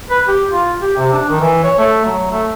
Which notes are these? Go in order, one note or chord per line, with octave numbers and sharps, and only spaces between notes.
B4
G4
F4
G4
C3
D4
D#3
E3
C#5
A3
F#3
A3